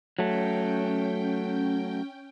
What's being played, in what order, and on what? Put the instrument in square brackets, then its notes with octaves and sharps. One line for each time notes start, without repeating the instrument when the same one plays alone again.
[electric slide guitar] F#3 A3 [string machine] C#4 G5